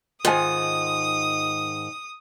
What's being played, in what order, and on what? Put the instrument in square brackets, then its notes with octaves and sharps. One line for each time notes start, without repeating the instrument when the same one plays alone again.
[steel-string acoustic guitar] G#2 D#3 [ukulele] F4 G#5 [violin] D#6